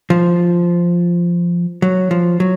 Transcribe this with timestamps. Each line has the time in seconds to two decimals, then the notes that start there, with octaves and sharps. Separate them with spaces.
0.10 F3
1.82 F#3
2.11 F3
2.40 F#3